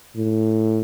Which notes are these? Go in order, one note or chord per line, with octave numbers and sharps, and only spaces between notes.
A2